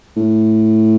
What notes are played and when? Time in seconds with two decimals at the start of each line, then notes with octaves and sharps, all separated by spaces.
0.17 A2